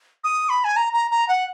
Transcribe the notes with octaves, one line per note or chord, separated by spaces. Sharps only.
D#6
B5
G#5
A#5
A#5
A#5
F#5